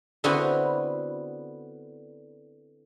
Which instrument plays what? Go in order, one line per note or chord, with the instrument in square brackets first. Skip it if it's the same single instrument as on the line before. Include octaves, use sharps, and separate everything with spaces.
[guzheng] D3 B3 C4 E4 F#4